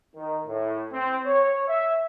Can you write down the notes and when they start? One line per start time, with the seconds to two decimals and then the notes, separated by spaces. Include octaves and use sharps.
0.16 D#3
0.47 A2
0.92 C4
1.26 C#5
1.68 E5